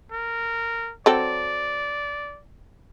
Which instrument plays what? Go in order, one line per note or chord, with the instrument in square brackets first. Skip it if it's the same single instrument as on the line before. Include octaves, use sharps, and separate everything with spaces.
[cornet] A#4
[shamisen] F#3 C4 A4 [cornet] D5